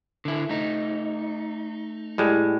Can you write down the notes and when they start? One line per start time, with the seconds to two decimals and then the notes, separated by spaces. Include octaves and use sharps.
0.25 D3 E4
0.49 A3 D#4
2.18 A2 G3 G#3